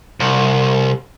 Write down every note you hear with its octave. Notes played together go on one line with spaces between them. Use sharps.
C2